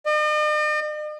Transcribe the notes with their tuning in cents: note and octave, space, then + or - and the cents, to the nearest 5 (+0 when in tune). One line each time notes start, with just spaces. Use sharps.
D#5 -45